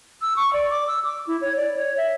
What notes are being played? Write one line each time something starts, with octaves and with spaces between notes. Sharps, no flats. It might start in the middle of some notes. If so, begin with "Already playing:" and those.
E6
C#6
D5
D6
E6
D6
E4
C#5
D5
C#5
E5